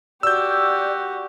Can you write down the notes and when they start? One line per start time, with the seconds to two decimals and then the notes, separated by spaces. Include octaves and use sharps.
0.23 F#4 G4 D5 E6 G6